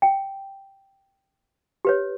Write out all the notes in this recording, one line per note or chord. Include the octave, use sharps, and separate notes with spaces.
G5
G4 B4 C#5